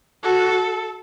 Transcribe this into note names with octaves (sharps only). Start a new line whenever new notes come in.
F#4 A4